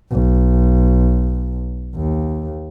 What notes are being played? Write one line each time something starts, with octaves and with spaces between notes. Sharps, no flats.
B1
D#2